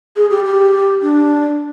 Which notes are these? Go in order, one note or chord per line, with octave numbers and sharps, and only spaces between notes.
G#4
G4
G4
D4